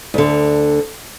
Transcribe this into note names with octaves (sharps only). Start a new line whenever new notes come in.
D2 D3